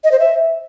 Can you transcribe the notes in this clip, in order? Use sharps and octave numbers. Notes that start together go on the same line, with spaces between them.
D#5
C5
E5